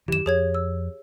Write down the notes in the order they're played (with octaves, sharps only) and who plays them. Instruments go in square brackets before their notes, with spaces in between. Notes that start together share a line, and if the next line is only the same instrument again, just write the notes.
[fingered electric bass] F#2 D#3 E3 [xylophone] G4 E7
[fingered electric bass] F2 [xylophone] G#4 C#5 G#6
[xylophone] E6